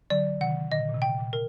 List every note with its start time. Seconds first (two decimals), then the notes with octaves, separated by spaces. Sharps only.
0.10 D3 F#3 D5
0.41 C3 D#3 F#5
0.71 A#2 D3 D#5
0.89 A#2
0.94 C3
1.02 G5
1.18 A#2
1.33 A#4